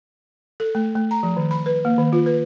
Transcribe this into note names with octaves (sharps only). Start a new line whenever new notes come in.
A4
A3
A3
A#5
F3
D#3
B5
B4
A#3
D#3
F4
B4